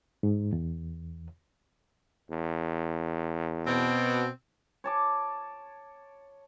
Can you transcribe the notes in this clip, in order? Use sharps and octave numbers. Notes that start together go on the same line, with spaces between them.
G#2
E2
E2
B2 C4
C#5 A5 D6